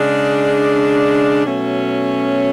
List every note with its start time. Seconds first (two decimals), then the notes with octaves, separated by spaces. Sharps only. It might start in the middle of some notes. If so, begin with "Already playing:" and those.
Already playing: C#3 G#3 D4
1.45 B2 F#3 A3 C#4